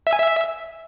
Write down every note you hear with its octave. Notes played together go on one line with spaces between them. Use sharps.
E5
G#5
E5